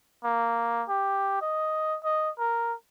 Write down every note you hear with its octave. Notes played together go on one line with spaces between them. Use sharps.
A#3
G4
D#5
D#5
A#4